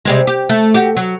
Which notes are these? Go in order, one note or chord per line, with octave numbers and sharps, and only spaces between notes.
C3 G3 G#3
G4
A3
F#4 G4
F#3